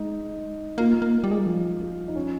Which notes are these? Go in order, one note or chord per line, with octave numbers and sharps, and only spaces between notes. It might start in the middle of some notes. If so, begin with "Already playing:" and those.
Already playing: G#3 D#4
A#3 F4
A#3
G3
G#3
G3
F3 F4
F4
D#4
C#4